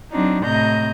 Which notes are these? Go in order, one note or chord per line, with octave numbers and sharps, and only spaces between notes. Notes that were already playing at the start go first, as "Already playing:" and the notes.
F#3 C4 D4 D#4
A2 C3 D#5 A#5 G6